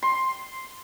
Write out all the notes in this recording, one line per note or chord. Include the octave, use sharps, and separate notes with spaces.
C6